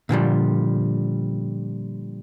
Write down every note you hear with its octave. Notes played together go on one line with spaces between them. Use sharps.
A#2 D3 F3 G3